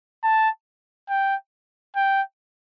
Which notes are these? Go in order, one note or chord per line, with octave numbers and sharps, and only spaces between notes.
A5
G5
G5